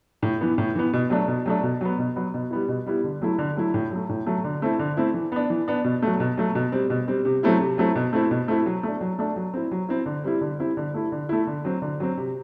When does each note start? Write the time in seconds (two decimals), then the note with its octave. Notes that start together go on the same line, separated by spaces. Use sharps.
0.22 A2
0.41 E3 B3
0.58 A2
0.75 E3 B3
0.93 B2
1.10 F#3 A3 D4
1.28 B2
1.46 F#3 A3 D4
1.63 B2
1.81 F#3 B3
1.99 B2
2.16 F#3 B3
2.34 B2
2.50 G3 B3 E4
2.68 B2
2.86 G3 B3 E4
3.04 D3
3.22 F#3 A3 E4
3.38 D3
3.57 F#3 A3 E4
3.74 A2
3.91 F#3 A3
4.09 A2
4.26 F#3 A3
4.44 D3
4.62 A3 C4 E4
4.79 D3
4.97 A3 C4 E4
5.14 E3
5.32 B3 D4
5.50 E3
5.68 B3 D4
5.84 B2
6.02 F#3 A3
6.20 B2
6.37 F#3 A3
6.55 B2
6.72 G3 C4
6.90 B2
7.08 G3 C4
7.25 C3
7.43 F#3 A3 C4 E4
7.60 C3
7.78 F#3 A3 C4 E4
7.95 B2
8.13 A3 C4 E4
8.31 B2
8.48 A3 C4 E4
8.66 F#3
8.83 A3 D4
9.01 F#3
9.19 A3 D4
9.36 F#3
9.54 C4 E4
9.71 F#3
9.89 C4 E4
10.06 D3
10.24 G3 C4 E4
10.41 D3
10.59 G3 C4 E4
10.77 D3
10.94 A3 E4
11.12 D3
11.29 A3 E4
11.47 D3
11.65 F#3 C4
11.82 D3
12.00 F#3 C4
12.17 C3